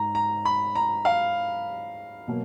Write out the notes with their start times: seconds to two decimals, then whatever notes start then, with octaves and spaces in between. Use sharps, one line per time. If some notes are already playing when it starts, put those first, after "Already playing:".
Already playing: G#2 A#5
0.15 A#5
0.45 B5
0.75 A#5
1.05 F5
2.28 B2 F#3 A#3